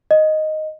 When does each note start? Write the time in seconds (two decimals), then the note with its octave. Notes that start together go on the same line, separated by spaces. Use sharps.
0.11 D#5